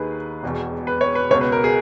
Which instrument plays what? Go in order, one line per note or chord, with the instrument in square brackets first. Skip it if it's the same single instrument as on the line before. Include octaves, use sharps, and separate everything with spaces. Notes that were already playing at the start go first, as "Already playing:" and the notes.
Already playing: [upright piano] D#2 D#3 G#4 B4
E1 E2 B2
B4
C#5
B4
C#2 C#5
B2
B4
A#4
G#4